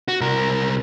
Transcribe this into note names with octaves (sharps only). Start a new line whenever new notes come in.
F#4
C2 A#4